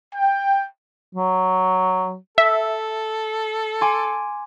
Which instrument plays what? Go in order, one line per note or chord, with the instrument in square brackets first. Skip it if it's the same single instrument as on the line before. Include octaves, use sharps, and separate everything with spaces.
[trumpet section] G5
[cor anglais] F#3
[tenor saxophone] A4 [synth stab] E5
[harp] G#5 C6 D6